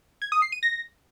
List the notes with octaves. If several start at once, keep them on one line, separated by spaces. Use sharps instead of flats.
G#6
D#6
C7
D#7
A#6